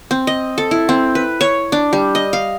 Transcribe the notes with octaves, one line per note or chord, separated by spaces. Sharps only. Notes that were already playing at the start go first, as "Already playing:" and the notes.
C4
D#5
A4
E4
C4
B4
C#5
D4
G3
D#5
F5